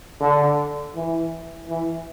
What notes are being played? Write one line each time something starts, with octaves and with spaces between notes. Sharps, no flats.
D3
E3
E3